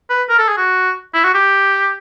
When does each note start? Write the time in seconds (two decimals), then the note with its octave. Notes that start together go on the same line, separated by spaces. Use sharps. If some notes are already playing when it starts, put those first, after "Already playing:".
0.10 B4
0.30 A#4
0.39 A4
0.49 G#4
0.57 F#4
1.15 E4
1.24 F#4
1.35 G4